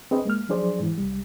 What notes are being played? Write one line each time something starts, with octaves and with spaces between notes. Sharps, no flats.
C4 D4 G#4 B4 D#5
G#3 A#3 F6
F3 F#3 D4 G#4 C5 D5
G#2 E3
C2 G3